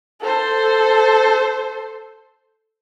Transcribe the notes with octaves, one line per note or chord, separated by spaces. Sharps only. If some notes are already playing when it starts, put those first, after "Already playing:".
A4 C5